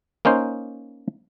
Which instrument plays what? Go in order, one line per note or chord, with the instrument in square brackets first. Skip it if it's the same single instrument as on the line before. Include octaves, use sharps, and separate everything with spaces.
[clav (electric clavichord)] A#3 C#4 D#4 C5